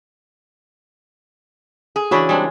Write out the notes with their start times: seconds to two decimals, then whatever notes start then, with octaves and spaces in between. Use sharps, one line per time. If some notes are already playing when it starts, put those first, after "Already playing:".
1.96 G#4
2.11 C#3 E3 D4 F#4 C#5 B5
2.29 G3 G#3 C4 D4